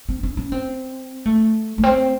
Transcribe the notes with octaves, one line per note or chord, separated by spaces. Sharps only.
C4
C#4
C#4
C4
A3
A3
C4